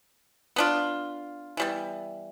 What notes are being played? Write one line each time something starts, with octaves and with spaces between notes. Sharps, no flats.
B3 D4 F4
E3 G3 B3